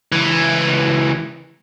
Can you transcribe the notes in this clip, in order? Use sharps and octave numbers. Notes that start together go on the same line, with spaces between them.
C#2 E3